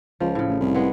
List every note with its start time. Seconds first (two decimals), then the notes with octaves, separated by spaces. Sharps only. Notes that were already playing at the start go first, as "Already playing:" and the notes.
0.20 C#2 F3
0.35 A2 C#3
0.48 A1
0.60 C2
0.75 G#3 B3